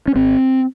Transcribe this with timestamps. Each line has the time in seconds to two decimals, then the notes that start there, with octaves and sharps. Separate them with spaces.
0.08 C#4
0.15 G#1 C4